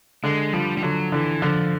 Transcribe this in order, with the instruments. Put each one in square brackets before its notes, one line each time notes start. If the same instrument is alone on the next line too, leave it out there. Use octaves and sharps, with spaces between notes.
[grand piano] D3 [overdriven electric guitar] G#3
[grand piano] F3 [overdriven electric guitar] G3
[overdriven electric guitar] G3
[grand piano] D3 [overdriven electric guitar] F#3
[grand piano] D3 [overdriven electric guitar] E3
[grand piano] D3 [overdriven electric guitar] F3